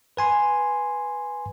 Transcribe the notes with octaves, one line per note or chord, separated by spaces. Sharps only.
B4 G#5 C6